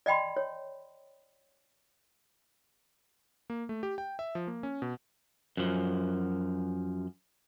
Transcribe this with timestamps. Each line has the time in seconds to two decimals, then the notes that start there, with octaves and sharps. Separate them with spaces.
0.06 D5 D#5 G5 B5 C6
0.37 C#5
3.50 A#3
3.69 A3
3.83 G4
3.98 G5
4.19 E5
4.35 F3
4.48 A#3
4.63 C#4
4.82 B2
5.57 F#2 F3